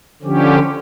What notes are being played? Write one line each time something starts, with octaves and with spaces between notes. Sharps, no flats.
D3 F3 C#4 G4